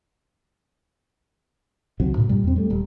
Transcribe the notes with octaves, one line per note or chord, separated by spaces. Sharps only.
C#2 D#3 F#3 C4
A2 C3
G2 A#2 G3
E2 C4
G3 A3
D#1 G3